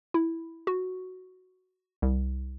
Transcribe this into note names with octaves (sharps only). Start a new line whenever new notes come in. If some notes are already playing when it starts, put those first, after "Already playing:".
E4
F#4
C2